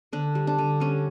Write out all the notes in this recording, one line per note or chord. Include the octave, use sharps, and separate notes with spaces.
D3 D4
G3
D4
D3
G3 C#4